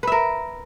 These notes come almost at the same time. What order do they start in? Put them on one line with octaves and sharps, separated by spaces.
B4 E5 A#4